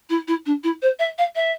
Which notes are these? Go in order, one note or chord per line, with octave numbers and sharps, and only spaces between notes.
E4
E4
D4
E4
C5
E5
F5
E5